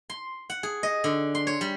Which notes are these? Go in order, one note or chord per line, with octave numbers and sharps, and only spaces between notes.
C6
F#5
G#4
D#5
D3
C6
C#5
G3